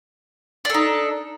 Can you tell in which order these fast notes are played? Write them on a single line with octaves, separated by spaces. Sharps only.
D4 A4 D#4